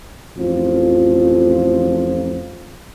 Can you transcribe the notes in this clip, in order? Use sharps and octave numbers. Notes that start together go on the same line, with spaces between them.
A1 F2 F3